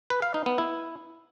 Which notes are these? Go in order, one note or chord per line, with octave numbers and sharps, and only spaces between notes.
B4
F5
D#4
B3
E4